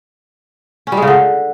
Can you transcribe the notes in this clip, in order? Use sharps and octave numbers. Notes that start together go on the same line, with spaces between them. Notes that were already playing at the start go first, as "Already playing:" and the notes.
C#4
G3
G#3
C#3
D3